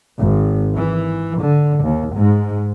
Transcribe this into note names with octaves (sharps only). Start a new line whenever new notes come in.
G#1
E3
D3
D#2
G#2